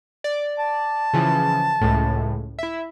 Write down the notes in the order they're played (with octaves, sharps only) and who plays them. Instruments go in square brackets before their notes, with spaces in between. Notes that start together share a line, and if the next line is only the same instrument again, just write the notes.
[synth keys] D5
[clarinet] A5
[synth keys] C#3 E3 F3
C#2 A2
E4 E5